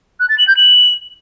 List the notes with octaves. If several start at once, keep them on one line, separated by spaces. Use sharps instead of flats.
F#6
A6
F#7
G6
F#7